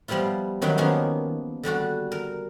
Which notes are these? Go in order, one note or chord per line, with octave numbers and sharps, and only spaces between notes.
F3 G3 B3 E4 F4
D#3 F#3 D#4 E4 B4 G5
D#3 F3 A#3 B3 C#4
D3 G3 D4 F#4
A#4